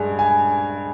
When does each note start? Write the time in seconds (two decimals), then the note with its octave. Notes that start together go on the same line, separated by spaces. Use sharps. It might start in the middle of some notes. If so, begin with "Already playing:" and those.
Already playing: G2 G#3 G#5
0.19 G#5